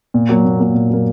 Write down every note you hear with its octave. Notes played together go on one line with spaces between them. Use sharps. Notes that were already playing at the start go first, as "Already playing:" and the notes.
A#2
F#3 A#3
A#2
F#3 A#3
A#2
F#3 A#3